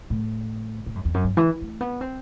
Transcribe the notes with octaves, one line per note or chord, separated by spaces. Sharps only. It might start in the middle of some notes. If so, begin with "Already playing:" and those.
A2
A2
F#2
E2
F#2
G2
E3
A3
B3
C4